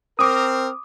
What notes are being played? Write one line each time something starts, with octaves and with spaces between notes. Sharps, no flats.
C4 A#4 D6 D#6